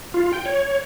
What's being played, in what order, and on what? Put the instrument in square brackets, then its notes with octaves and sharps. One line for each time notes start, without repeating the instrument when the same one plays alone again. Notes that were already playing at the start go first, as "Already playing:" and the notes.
[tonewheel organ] F4
G5
C#5